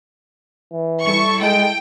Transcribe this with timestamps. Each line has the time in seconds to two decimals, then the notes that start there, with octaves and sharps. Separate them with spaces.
0.72 E3
1.05 G3 E4 A4 C#6
1.42 G#3 G5